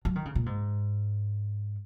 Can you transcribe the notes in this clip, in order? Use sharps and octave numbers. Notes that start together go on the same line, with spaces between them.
F#3
D#3
C#3
A#2
G#2